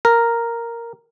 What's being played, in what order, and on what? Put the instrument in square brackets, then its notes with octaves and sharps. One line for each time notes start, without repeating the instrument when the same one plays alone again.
[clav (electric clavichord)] A#4